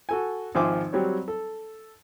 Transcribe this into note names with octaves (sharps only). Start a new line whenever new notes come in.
F#4 A4 G#5
G#1 F3 C5 E5 G#5 D6
F#3 G3 C4 C#5
A4